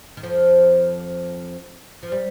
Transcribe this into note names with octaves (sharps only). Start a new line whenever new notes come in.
D#3
F2 F3
F3
G3